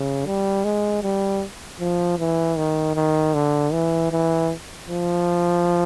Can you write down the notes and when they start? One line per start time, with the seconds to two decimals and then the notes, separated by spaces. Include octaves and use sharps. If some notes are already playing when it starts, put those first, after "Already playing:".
Already playing: C#3
0.26 G3
0.64 G#3
1.03 G3
1.80 F3
2.19 E3
2.57 D#3
2.96 D#3
3.34 D3
3.73 E3
4.12 E3
4.88 F3